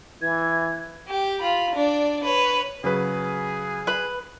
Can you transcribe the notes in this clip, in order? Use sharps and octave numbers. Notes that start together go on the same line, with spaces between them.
E3 G#6
G4
F4 B5
D4 D5
B4 C#5
C#3 F#3 G#4 B4
B4 B5